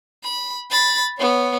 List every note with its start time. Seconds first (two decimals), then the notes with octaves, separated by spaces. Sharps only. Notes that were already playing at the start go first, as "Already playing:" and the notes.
0.24 B5
0.70 B5 A6
1.18 B3 C#5